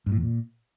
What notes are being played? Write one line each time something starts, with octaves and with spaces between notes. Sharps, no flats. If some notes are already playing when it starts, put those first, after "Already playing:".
G2
A2
E2
A#2